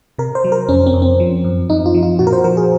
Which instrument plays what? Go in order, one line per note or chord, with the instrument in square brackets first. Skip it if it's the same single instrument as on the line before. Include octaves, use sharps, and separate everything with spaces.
[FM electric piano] C3 A#4
C5
F#3
A#4
F2 C#4
C4
F2
C4
F3
F#2
F#2 D#4
F4
F3
F4
A#2 F#4
A#4
C5
F3 A#4
G#4